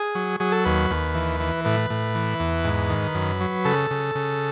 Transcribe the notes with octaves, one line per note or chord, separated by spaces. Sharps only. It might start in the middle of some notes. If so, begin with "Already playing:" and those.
Already playing: G#4
F#3
F#3 G#4
A4
D#2 B4
D#2
E3
E3
A2 B4
A2
E3
E2
G#2
D#3
F#2
F#3
C#3 A4
C#3
C#3